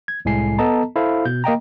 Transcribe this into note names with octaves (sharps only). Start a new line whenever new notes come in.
G#6
C2 A2 G#3 A3 G#5 C7
B3 A4 D#5 A5 A#5
E4 A4 C5 F5
B2 G6
A#3 D#5 G5 A#5